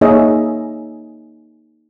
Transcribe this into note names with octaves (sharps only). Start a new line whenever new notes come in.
A#3 D#4 G#4 C#5 D#5 E5